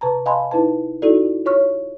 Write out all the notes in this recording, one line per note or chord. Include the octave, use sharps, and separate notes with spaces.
C3 B4 A5 A#5
D#5 F5 G#5 A5 B5 C6
D#4 E4 B4 A5
D#4 E4 F#4 A4 D5
F4 C#5 C#6 F6